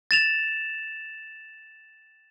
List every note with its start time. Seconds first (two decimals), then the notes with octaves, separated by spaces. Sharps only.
0.11 A6 E7 F7